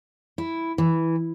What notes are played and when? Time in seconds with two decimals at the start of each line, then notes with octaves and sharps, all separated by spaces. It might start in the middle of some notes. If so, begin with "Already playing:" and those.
0.38 E4
0.78 E3